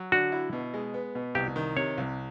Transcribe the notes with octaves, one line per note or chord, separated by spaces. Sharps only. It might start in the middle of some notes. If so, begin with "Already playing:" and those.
Already playing: F#3
D3 F#4
E4
B2
G#3
B3
B2
C2 G4
D#3
C3 C#5
C2